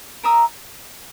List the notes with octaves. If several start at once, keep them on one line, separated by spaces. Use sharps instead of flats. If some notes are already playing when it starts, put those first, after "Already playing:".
A#4 E5 A#5 D#6